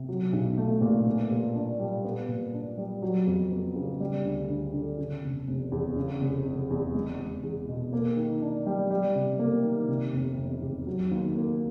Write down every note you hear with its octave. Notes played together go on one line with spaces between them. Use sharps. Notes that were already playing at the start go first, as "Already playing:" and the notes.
Already playing: C3
F#3
B1
A3
A#2
B3
A#2
D4
G3
B3
A#2
D4
G3
F#3
F2
B3
C#3
G3
D2
D2
D3
C#3
F1
F1
E2
C#3
F1
F1
E2
G#3
E2
E2
B2
A#3
D#3
D4
G3
G3
C3
A#3
D#3
C3
F1
F1
E2
F#3
D#2
A#3